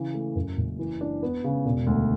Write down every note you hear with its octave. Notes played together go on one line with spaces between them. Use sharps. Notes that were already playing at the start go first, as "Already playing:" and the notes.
Already playing: C#3 E3
A3
F#2
F#1
E3
D4
B3
C#3
E1
D2